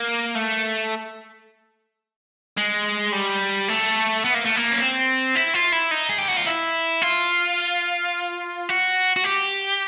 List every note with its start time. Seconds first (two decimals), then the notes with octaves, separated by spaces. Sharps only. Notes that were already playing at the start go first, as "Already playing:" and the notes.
Already playing: A#3
0.35 A3
2.57 G#3
3.13 G3
3.68 A3
4.25 B3
4.34 A#3
4.45 A3
4.56 A#3
4.71 C#4
4.80 C4
5.36 E4
5.54 F4
5.72 E4
5.91 D#4
6.09 G#4
6.18 G4
6.28 F#4
6.37 F4
6.46 E4
7.02 F4
8.69 F#4
9.16 F#4
9.24 G4